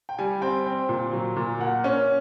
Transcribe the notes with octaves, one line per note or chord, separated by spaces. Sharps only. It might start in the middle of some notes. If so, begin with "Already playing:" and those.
G5
G3 G#5
C4 G5
C4
A#2
F#3
A#2
A#3 F#5
C#4